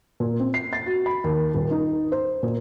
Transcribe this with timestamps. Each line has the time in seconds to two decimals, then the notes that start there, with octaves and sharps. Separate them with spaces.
0.20 A#2
0.40 C4
0.54 C7
0.73 A6
0.86 F#4
1.06 B5
1.24 D#2
1.55 D#1
1.71 D#4
2.12 C5
2.43 A#2